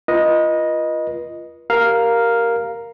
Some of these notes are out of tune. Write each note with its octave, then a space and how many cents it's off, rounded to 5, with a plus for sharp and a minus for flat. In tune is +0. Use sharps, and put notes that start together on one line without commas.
F4 -20 B4 -40 D#5 +0
G4 +0 A#4 +0 F5 +0